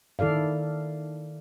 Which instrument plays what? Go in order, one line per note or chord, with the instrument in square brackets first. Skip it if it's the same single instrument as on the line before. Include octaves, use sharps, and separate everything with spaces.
[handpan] D#3 E4 A4 D5 F5